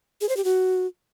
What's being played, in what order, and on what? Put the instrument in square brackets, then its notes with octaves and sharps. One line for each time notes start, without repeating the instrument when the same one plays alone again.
[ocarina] G#4
C5
G4
F#4